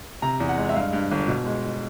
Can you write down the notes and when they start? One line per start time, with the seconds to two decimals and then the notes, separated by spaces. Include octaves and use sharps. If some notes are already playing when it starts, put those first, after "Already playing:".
0.22 C3 A#5
0.40 E2
0.49 F#5
0.57 G#3
0.69 E5
0.75 G2 F5
0.93 G2
1.11 G1
1.28 B2
1.46 G#3